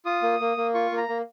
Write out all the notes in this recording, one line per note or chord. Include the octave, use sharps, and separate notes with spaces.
F4 D#6
A#3
A#3
A#3
F4 C#6
A#3
A#5
A#3